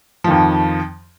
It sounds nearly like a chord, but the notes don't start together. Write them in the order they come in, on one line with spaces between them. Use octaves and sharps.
F3 D#3 F2